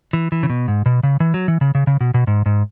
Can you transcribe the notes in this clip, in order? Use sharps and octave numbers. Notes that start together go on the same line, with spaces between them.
E3
E3
C#3
B2
G#2
B2
C#3
E3
F#3
E3
C#3
C#3
C#3
B2
B2
G#2
G#2